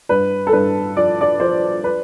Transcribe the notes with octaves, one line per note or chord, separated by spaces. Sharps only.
G2 B4
A4
G2 B4
F3 D5
D5
F3 C5
B4